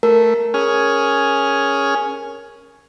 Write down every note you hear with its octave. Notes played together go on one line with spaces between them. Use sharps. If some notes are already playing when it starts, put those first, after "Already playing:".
A3 A#4
C#4 G#4 F6